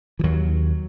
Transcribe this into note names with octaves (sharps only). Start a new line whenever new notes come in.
E3
D#2 F#3